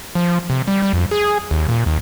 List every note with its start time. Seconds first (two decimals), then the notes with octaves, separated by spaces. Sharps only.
0.15 F3
0.50 C3
0.68 G3
0.82 G3
0.93 F2
1.11 G#4
1.51 D#2
1.69 A#2
1.86 D#2